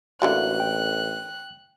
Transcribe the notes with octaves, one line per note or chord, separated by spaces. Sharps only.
A1 D3 E3 A#3 F#4 F#6
G5